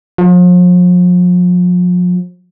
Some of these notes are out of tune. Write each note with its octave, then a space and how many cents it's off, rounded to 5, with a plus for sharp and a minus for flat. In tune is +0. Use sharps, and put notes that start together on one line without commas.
F3 +40